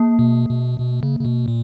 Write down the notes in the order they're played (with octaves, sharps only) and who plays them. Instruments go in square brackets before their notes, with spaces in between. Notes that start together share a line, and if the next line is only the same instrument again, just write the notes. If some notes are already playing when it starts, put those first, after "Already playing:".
Already playing: [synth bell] A#3
[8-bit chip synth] B2
B2
B2
C#3
C#3
B2
A#2